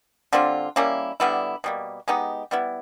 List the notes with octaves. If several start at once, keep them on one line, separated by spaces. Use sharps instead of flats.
D3 G3 C4 F4
G3 A#3 C#4 E4
D3 G3 B3 E4
B2 G3 A#3
G#3 B3 D#4 G4
G3 B3 E4